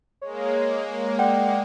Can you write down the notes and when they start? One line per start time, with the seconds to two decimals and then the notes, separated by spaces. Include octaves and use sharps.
0.22 G#3 A#3 C#5
1.19 D5 F#5 G5